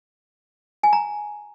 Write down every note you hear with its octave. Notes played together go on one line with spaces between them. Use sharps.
G#5
A#5